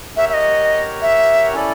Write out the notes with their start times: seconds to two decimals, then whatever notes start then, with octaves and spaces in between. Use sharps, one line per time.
0.16 G4 A#4 C#5 E5 F#5
0.29 E5
0.34 D#5
1.02 E5
1.53 C#4 E4 A4 D5